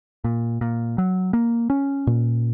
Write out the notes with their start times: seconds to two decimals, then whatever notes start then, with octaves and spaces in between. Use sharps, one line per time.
0.24 A#2
0.61 A#2
0.98 F#3
1.33 A#3
1.70 C#4
2.07 A#2